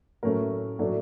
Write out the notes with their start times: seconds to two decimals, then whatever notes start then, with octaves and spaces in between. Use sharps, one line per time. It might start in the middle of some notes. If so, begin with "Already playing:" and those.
0.23 A2 F#3 A3 C#4 A#4
0.79 A2 F#3 A3 D4